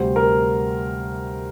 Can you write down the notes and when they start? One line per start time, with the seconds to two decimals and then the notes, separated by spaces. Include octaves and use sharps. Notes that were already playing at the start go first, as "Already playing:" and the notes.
Already playing: D2 C3 G3 C5
0.16 A#4